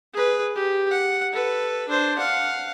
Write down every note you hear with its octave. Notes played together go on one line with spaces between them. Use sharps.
G#4 B4
G4
F#5
A4 B4
D4 C5
F5 F#5